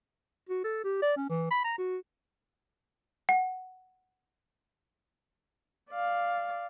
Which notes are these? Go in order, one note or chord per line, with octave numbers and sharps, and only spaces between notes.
F#4
A4
G4
D5
C#4
E3
B5
A#5
F#4
F#5
D5 F5